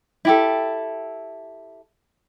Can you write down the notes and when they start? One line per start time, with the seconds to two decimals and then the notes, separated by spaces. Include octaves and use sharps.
0.25 E4 G4 A4